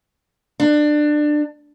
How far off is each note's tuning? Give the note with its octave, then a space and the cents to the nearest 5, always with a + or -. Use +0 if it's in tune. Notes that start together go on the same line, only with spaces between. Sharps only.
D4 +20